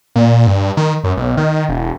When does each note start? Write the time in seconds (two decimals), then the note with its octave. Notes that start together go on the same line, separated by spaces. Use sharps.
0.16 A#2
0.47 G2
0.77 D#3
1.04 F#2
1.17 B1
1.37 D#3
1.69 E1